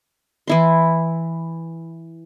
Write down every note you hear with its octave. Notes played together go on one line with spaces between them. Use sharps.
E3 E4 C6